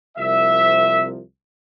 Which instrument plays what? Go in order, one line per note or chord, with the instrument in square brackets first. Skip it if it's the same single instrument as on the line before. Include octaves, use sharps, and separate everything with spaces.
[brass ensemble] C2 C3 F3 A#3 E5